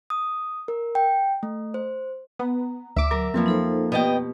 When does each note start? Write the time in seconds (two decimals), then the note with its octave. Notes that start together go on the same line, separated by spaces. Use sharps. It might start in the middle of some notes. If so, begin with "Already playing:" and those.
0.10 D#6
0.68 A#4
0.95 G5
1.43 A3
1.74 C5
2.39 B3 A#5
2.96 D2 E5 D6
3.11 F#3 A#4
3.34 F2 F3 F#3 A#3 C4 B4 B5
3.46 D#4 A4 C5
3.92 B2 A#3 B3 G4 D#5 G5